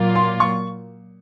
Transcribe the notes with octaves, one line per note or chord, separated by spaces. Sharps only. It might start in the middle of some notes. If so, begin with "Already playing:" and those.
Already playing: A#2 F#3 A#3 F4
C6
C#6